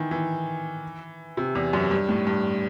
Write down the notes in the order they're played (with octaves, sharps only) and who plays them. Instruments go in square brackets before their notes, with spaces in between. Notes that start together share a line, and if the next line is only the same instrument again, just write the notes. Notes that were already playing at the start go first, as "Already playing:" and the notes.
Already playing: [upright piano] D#3 E3
E3
C3
E2
F#2
G2
A2
G2